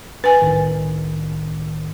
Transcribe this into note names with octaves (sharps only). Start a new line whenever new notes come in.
B4 G#5
C2 A2 D#3